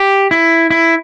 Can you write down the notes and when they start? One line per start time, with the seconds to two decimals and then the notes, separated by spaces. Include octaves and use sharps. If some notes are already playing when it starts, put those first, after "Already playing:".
Already playing: G4
0.31 E4
0.70 E4